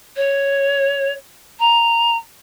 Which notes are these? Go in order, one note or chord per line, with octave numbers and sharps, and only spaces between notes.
C#5
A#5